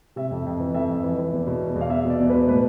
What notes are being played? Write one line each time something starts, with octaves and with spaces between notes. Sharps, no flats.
C3 E5
F2
F2
E3
F2 E5
F2
E3
E3
E2
B2
E2
E2
F5
E2 E5
B2
D5
E2
B2 B4
A2 B4